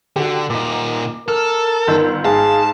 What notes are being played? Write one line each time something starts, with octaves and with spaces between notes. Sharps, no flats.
D3 F#4 G4
A#2 D#4 D6
A4 A#4 F6
G1 D#3 E6
G#2 G#4 F5 A5